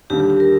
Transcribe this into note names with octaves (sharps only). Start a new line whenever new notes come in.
D#2 D3 G3 G4
G4
G4
A#4